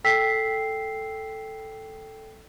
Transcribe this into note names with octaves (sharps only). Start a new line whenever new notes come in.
A4 G5 E6 B6 C7